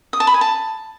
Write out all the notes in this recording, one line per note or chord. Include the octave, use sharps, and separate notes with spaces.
D#6
A5
B5
G#5
A5